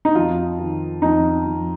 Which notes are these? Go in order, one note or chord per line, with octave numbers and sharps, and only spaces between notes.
D#4
F2 F4
D#3
F2 D#4
F2